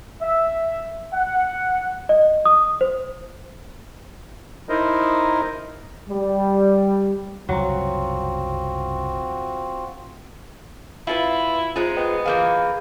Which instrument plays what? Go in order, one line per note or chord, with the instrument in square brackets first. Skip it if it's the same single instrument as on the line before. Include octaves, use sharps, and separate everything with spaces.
[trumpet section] E5
F#5
[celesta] D#5
D#6
C5
[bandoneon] D#4 E4 A#4 C5 D#5
[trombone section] G3
[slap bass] C2 F#2 C#3 [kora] F#3 [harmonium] C4 F4 F#4
[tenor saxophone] E4 [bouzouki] F4 A4 B4
[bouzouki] G#3 D#4 G#4 [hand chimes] F4 C5 F#6
[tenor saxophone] B3 [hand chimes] D#5 G5
[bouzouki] E3 A#3 G#4 [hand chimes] F5 F6 G6